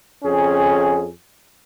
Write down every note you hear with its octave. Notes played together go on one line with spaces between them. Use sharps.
F2 C#4 G#4